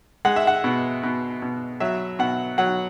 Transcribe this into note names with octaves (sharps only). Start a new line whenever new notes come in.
G#3 F#5
E5
F#5
B2
B2
B2
F#3 E5
B2 F#5
F#3 F#5